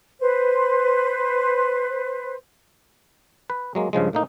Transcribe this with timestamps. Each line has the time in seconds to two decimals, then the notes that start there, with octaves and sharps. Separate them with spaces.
0.21 B4 C5
3.50 B4
3.75 F#3 G#3 A#3
3.93 G2 C#3 F3 G#3
4.13 A2 A#3 D#4